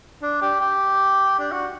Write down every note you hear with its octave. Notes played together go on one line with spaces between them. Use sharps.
D4
G4
G4
D4
F#4